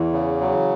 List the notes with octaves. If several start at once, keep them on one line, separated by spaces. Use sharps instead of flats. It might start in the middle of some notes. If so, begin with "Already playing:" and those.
Already playing: E2 E3
C#3
F#3